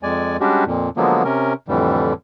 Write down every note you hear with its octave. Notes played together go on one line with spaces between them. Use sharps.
F2 G#3 D5 G#5
G3 G#3 C#4 D4 F#4 G4
F2 A#2
D3 F3 F#3 G#3 A#3 B3
C3 C#4 A#4
F2 A2 D3 E3 G3